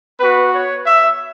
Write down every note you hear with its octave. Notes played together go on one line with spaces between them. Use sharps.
B3 F#4 B4
C#5
E5